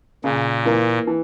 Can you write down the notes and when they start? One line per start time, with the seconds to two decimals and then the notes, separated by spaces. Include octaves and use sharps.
0.24 A#2 C#3
0.65 E3 A#3
1.07 E3